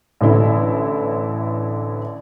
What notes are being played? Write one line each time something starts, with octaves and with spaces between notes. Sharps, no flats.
A1 D3 E4